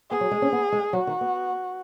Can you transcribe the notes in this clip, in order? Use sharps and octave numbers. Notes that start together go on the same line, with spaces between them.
B3 G#4
F#3
G#3
C#4
B3
G#3
F#3 F#4
D#3
B3